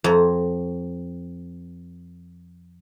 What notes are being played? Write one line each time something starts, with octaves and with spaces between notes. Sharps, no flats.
F2 A#5